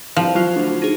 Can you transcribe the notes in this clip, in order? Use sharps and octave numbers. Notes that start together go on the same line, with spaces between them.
C2 F3
F#3 F4 F6
D2
D#4 G#4